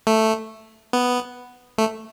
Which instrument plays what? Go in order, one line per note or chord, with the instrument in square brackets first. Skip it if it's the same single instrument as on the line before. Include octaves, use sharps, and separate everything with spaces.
[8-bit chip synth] A3
B3
A3